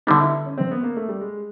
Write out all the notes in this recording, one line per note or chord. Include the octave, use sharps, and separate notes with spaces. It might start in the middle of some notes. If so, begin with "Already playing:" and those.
D3 G3 B3 D#4
E4
C#4
C4
B3
A#3
A3
G3
G#3